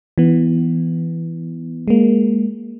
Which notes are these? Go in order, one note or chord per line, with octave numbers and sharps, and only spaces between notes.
E3 B3
G#3 A#3